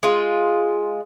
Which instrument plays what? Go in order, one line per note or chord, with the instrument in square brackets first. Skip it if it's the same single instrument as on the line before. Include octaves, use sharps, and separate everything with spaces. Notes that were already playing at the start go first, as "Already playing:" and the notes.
[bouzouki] G#3 F4